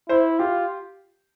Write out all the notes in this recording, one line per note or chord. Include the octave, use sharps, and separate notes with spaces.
E4 C5
F4 G4